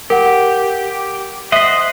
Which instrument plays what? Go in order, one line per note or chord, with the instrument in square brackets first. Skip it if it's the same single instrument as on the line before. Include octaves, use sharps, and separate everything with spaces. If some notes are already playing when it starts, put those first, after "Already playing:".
[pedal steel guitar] G4 [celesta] A#4 F#5
[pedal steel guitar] C5 D#5 F#5 [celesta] E5 B6